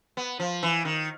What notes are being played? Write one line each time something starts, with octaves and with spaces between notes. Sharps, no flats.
B3
F3
E3
D#3